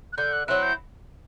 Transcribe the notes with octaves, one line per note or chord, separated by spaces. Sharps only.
F#6
D3 G6
F#6
F#3 C4 E4 F#6
G6